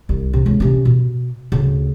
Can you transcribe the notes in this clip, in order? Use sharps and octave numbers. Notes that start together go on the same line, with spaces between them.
C2
C3
C#2
C3 C#4
B2
D2 C#3